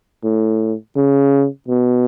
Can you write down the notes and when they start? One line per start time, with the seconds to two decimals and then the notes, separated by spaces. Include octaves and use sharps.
0.24 A2
0.96 C#3
1.68 B2